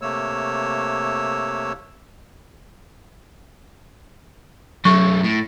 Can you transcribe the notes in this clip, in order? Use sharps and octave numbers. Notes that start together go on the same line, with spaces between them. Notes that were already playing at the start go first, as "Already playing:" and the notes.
C3 A3 A#3 C#5 E6
F#2 F#3 A3 C#6
A2